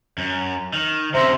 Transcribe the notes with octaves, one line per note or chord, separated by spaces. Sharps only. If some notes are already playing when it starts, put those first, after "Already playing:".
F#2
D#3
F#2 C3 C5 E5 A#5